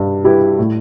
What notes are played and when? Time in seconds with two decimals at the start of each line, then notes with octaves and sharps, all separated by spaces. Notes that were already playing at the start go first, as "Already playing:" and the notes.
Already playing: G2 G3
0.24 G3 E4 G4 B4
0.59 A2